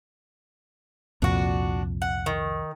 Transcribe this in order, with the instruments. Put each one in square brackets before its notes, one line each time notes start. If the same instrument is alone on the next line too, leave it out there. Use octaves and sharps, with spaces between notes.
[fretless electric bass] C2 F2 A#2 [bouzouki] D4 F#4
[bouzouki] F#5
D#3